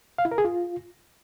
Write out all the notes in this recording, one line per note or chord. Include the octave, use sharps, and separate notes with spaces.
F5
E4
A#4
G#4
F4